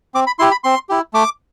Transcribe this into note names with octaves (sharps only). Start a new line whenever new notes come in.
C4 D6
B5
E4 G4 C6
B5
C4 C6
E4 G4
A3 D6